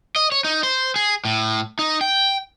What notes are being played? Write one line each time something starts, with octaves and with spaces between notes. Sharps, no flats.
D#5
C#5
D#4
C5
G#4
A2
D#4
G5